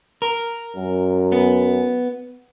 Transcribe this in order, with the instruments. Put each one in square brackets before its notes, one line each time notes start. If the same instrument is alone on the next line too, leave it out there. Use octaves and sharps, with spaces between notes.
[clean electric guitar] A#4
[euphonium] F#2
[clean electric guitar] B3